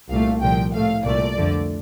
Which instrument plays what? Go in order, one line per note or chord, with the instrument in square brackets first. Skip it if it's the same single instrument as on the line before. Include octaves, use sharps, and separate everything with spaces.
[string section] C2 A#2 A3 F5
C2 A#2 F3 G5
A2 A3 F5
C2 A#2 A3 D5
F2 D3 A3